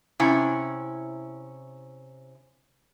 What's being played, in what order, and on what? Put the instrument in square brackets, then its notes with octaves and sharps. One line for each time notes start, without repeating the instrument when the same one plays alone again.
[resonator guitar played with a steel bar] C3 C#4 E4